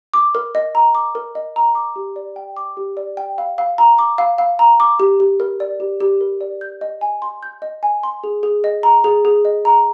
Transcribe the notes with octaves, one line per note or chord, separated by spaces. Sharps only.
D6
A#4
D#5
A#5
D6
A#4
D#5
A#5
D6
G4
D5
G5
D6
G4
D5
G5
F5
F5
A#5
D6
F5
F5
A#5
D6
G4
G4
A#4
D5
G4
G4
A#4
D5
G6
D#5
G#5
C6
G6
D#5
G#5
C6
G#4
G#4
D#5
A#5
G#4
G#4
D#5
A#5